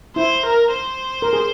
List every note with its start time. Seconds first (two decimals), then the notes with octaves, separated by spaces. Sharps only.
0.16 E4 C5
0.46 A#4
0.74 C5
1.22 A#4
1.33 G#4